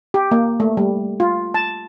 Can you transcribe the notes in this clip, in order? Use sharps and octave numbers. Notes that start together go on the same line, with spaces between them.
G4
A#3
A3
G3
F4
A5